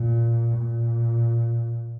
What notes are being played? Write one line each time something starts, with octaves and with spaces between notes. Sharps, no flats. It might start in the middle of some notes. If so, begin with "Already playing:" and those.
Already playing: A#2
A#2